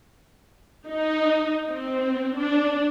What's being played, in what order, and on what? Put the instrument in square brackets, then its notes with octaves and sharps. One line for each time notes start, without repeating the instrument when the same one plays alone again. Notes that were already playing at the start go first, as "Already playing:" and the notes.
[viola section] D#4
C4
D4